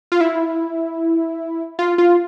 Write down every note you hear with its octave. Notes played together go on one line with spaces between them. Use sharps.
F4
E4
F4
F4